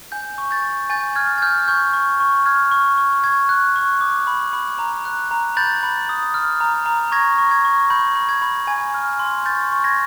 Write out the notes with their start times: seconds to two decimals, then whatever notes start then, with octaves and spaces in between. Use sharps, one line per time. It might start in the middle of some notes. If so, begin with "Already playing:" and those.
0.12 G#5 G6
0.38 C#6
0.51 G6 A6
0.64 C#6
0.90 G#5 G6 A6
1.15 F6 G#6
1.38 G#6
1.42 F6 G6
1.68 C#6 G6
1.94 C#6
2.20 C#6
2.46 F6 G#6
2.71 C#6
2.98 C#6
3.24 C#6 G#6
3.49 F#6
3.76 C#6
4.01 D6
4.27 B5
4.53 B5
4.79 A#5
5.05 F#6
5.31 A#5
5.57 B5 G6 A6
5.83 B5
6.09 D#6
6.34 F6
6.61 A#5
6.86 A#5
7.12 C#6 G#6 A#6
7.38 C#6
7.51 G#6
7.65 C#6
7.90 B5 G6
8.16 B5
8.29 G#6
8.42 B5
8.67 G#5 G#6
8.94 F6
9.19 C6
9.45 C#6 G6 A6
9.72 C#6
9.84 G#6 A#6